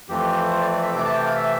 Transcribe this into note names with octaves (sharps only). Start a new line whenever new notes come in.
F2 E3 A3 C4 G4
C5
D5
D5
E5
C3 E3 A3 D6
A5
G5
F5
E5